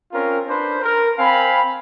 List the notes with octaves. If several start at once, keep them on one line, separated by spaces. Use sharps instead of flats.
C4 C#4 F4 A#4
D4 B4 C5
A#4
C4 F5 G#5 B5